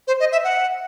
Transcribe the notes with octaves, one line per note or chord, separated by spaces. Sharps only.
C5
D#5
E5
F#5